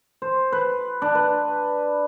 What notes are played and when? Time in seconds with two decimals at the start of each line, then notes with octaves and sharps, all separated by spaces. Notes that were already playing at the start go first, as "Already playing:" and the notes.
0.22 C5
0.52 B4
1.02 D4
1.15 B4